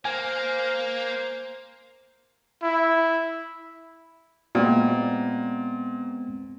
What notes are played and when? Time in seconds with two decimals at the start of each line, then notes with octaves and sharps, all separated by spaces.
0.05 A#3 C5 G#5
2.62 E4
4.55 A#2 G#3 B3 C4